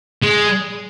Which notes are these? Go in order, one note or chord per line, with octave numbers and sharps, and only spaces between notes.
G#3